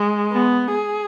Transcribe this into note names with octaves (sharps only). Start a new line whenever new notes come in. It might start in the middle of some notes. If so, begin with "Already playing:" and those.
Already playing: G#3
B3
G#4